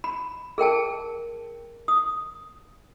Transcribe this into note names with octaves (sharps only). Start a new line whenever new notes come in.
B5
G#4 A#4 G5 A5
D#6